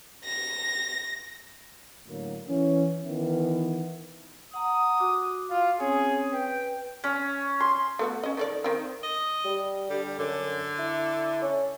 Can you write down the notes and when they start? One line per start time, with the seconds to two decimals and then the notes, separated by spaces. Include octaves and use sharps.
0.24 A#6
2.08 A2 D3 F#3 A#3
2.48 E3 C#4
3.03 D#3 E3 B3 E4
4.54 F#5 A#5 D#6
4.99 F#4 D6
5.50 F4
5.80 C4 C#4 G#4 C#5
6.33 B4 G5
7.04 C#4
7.60 C6
7.99 A3 B3 F#4
8.23 C#4 D#5
8.37 D#3 A4 D5
8.64 D#3 C4
9.03 D#5
9.45 G3
9.90 D3 G3
10.19 F#2 D3
10.79 E4
11.42 C#4